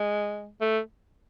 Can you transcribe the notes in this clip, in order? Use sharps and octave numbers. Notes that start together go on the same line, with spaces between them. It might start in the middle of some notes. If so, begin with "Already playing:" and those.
Already playing: G#3
A3